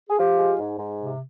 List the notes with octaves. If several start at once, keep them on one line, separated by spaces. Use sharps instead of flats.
G#4
F3 F4 G4
G#3
G#2
G#2
C3